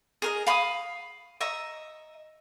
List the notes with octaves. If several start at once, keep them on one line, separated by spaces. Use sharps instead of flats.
G#4 A#4 D#5
F5 B5 C#6 D#6
D#5 E5 A#5 C#6